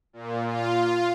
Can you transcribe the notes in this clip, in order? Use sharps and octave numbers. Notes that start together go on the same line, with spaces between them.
A#2
F4